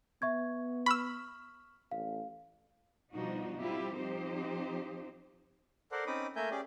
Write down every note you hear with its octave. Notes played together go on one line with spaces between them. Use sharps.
B3 E5 C#6 G#6
B5 C#6 E6 F6
A1 F5
B2 F3 G3 D4 D#4 F#4
F3 G3 C4 E4 F4 G4
F3 C4 D#4 G4 C5
A4 A#4 C5 D5 F#5
C4 C#4 D#4 B5 D6 D#6
A3 A#3 A#4 E5 G#5 G6
C#4 G4 G#4 D5